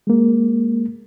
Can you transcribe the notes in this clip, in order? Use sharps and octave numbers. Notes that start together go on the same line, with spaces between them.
G#3 A#3